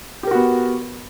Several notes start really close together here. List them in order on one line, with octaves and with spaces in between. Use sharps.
G4 A#4 F#4 B3